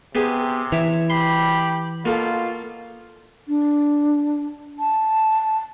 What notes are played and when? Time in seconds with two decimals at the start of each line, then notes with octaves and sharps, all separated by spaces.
0.15 C3 B3 G4 G#4
0.72 E3 C#5 E5 D6
1.10 G4 B5 C6
2.05 B2 A#3 F4 A4
3.48 D4
4.79 A5